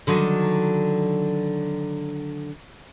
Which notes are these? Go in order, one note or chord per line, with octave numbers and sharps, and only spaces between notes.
D3 D#3 F#3